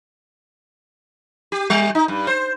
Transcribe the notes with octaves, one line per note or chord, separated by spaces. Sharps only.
G4
G3
D#4
G2
C5